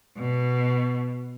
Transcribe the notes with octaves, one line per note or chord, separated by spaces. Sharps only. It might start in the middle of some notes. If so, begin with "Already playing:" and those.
B2